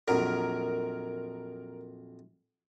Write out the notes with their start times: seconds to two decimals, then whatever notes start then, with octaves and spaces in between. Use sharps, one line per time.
0.08 A#1 F2 F#3 A#4